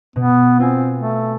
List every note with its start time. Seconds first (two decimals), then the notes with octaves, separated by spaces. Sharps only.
0.16 B2 B3
0.59 C4 F4 G#5
0.99 A3